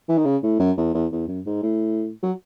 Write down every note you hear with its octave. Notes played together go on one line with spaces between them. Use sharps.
E3
D#3
C#3
A2
F#2
E2
E2
E2
F#2
G#2
A2
F#3